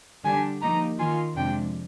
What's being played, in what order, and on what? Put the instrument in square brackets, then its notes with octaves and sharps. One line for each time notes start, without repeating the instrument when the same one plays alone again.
[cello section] D3 G3 D4 G4 [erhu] G#5
[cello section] F3 A#3 D#4 G4 [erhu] A#5
[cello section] D#3 A#3 F4 [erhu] G#5
[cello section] F2 C3 F3 G#3 D4 [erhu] G5